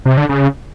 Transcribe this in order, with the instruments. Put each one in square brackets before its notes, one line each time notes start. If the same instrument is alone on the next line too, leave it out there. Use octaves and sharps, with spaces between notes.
[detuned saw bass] C3
D3
C#3